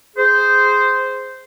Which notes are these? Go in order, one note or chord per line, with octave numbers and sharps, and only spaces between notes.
G#4 C5